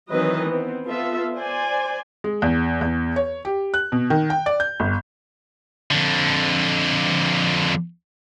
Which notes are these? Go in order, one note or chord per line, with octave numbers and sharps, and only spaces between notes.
D#3 E3 F#3 C4 B4 D#5
B3 C4
B3 F4 A4 E5
C5 D5 G#5
G#3
E2
E2
C#5
G4
F#6
B2
D#3
G5
D5
G6
G1
F2 D3